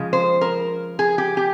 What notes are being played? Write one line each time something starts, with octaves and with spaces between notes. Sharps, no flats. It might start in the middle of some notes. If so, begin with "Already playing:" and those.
Already playing: C#3 F3 G#3
C5
A#4
G#4
G4
G4